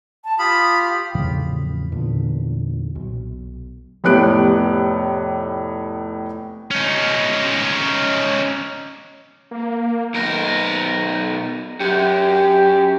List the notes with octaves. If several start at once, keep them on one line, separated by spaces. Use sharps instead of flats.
A5
F4 G4 F5 B5 D#6
E2 A2 C#3 F3
E2 A#2 D3
B1
F1 A2 B3 G4 F#6 D7
C#4 D#4
A#3
B1 A#4
F#2 G4